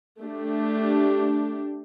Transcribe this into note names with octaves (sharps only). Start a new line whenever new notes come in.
A3 D4 G4